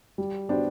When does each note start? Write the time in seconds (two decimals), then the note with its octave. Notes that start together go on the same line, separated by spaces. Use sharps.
0.18 G3
0.49 B3 D4 G4 C5